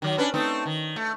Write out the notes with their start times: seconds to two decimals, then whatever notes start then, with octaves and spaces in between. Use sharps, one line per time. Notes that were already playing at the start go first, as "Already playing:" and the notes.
0.02 D#3 F#3
0.18 C#4 D4 B4
0.34 A3 C4 D#4
0.65 D#3
0.96 A3